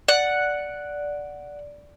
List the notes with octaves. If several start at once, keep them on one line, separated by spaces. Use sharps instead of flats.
D5 F#5